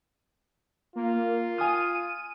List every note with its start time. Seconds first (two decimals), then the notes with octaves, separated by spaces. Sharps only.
0.95 A#3 F4
1.58 G#5 D#6 F6 D#7